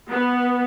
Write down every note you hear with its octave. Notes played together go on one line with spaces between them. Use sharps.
B3